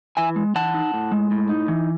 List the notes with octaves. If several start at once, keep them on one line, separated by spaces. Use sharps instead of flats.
E3 E5 G#5
G#3
E3 F#5 A5
D#4
A2
G#3
A2
D#4
E3